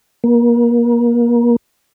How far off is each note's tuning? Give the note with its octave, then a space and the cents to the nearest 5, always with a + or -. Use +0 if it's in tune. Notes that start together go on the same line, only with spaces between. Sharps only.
A#3 +30